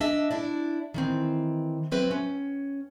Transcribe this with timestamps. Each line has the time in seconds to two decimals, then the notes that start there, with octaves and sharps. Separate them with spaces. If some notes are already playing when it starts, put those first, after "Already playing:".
0.01 D4 D#5 E5
0.31 D4 E4 D5
0.94 D#3 E3 C4
1.92 F#3 C4 B4 E5
2.11 C#4